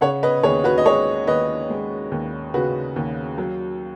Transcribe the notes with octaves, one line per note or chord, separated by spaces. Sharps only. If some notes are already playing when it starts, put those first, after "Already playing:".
C#3 C#5 F#5
B4 D#5
D#2 G#4 C#5
F#4 B4
D#5
G#3 G#4 C#5
D#2 B4 D#5
G#3
D#2
C#3 F#4 B4
D#2
F#3